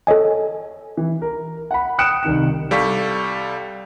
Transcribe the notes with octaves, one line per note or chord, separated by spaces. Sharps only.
A4 C#5 D#5 G#5
E3
A#4
F#5 B5
G5 D#6 F#6 C#7 D7 E7
C2 D#3 D#4 E7
C2 G3 A4 F5 C#6 B6